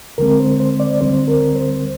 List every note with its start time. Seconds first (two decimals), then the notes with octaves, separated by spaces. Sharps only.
0.18 D2 D3 G#3 C4 A#4
0.40 C5
0.60 C5
0.80 D5
1.01 D2 D3 G3 C4 C5
1.28 A#4
1.55 C5